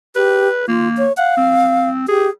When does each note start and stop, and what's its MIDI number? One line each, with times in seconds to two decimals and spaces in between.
0.16 0.48 67
0.16 0.65 71
0.68 1.06 58
0.68 0.88 65
0.97 1.12 73
1.17 1.89 77
1.17 1.36 78
1.37 2.07 60
2.08 2.29 67
2.08 2.29 68